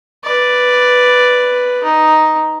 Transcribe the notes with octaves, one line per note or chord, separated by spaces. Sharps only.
B4 D5
D#4